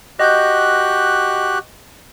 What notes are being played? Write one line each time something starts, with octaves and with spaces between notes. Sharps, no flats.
F#4 G4 D#5 F#6 G6